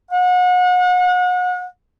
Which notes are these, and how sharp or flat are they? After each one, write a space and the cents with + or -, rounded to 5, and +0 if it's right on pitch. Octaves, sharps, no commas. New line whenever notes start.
F#5 -35